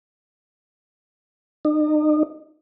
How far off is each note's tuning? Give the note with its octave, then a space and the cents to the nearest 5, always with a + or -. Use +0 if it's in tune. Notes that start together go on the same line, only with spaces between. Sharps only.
D#4 -40